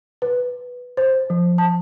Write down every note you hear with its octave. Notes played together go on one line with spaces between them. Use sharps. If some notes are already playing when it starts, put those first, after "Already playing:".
B4
C5
F3
A5